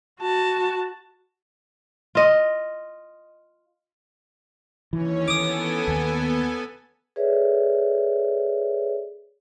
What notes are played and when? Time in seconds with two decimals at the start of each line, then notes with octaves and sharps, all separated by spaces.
0.21 F#4 A5
2.15 F4 D#5
4.93 D#2 E3 C#4 C#5
5.28 B3 A4 G#5 D6 D#6
5.88 D#2
7.16 G#4 A4 B4 C#5 D5 E5